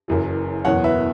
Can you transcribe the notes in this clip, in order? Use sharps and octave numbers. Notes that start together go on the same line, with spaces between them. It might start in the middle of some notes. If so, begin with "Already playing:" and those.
F#1 F#2 E3
F#1 E2 B2 C#5 F#5
B4 E5